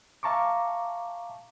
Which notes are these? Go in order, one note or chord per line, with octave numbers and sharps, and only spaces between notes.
E5 F5 A5 A#5 C#6 D6